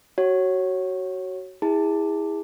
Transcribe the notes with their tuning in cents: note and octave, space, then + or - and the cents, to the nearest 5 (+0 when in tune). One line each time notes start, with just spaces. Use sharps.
F#4 +20 C#5 -10
E4 -20 G#4 -25 A5 +20